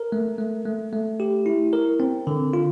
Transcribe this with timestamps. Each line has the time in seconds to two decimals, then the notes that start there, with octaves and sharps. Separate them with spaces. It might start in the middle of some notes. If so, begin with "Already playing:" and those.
Already playing: A#4
0.12 A3
0.38 A3
0.66 A3
0.93 A3
1.20 G4
1.46 E4
1.73 A#4
2.00 C4
2.27 D3
2.53 F4